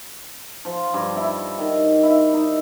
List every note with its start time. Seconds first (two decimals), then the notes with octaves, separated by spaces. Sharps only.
0.65 F3
0.94 G2
1.17 E4
1.58 D#3
2.03 E4
2.34 D#4